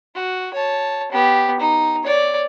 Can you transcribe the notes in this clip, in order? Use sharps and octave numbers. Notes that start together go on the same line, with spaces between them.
F#4
C#5 A5
B3 G4
D#4
C#5 D5